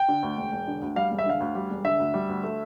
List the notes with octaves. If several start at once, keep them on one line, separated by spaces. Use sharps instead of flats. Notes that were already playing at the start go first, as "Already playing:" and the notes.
Already playing: G5
D3
D2
E1
E1
D3
D2
G3 F5
E1
E5
D3 F5
D2
G3
E1
D3 E5
D2
G3
D2
A3